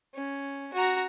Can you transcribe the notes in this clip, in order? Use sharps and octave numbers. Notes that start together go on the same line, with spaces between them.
C#4
F#4 A#5